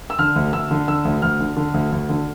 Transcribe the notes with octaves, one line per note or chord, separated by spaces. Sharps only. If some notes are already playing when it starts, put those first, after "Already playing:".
E6
D3 F6
D2
D2 E6
D3
D3 E6
D2
D2 F6
D3
D3
D2
D2
D3